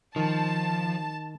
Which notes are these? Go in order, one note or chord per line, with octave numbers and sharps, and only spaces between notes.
D#3 F3 A5